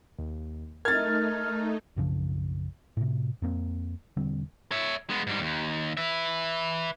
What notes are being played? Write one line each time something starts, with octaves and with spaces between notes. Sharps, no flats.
D#2
A3 D#4 A#4 F6 G#6 A6
B1 F#2 C#3 F3
A2 C3
F2 A#3 C4
E1 D3 G3 C4
C#5 E5
G#3 B3
G#2 G3
D#2
B4 E5